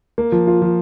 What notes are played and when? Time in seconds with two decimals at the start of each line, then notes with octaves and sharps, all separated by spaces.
0.18 A#3
0.32 F3
0.47 F4
0.62 F3